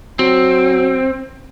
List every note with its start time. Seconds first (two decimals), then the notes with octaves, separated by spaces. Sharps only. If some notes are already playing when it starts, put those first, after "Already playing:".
0.19 F#3 C4